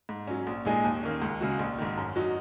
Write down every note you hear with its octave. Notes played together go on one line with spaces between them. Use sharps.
G#2
F#3 C#4
A#1
A#2 G#3 D#4 G#4
D#2
D#3 A#3 C#4
C#2
C#3 G#3 F#4
A#1
G#2 D#3
F#2
F#3 D#4 F#4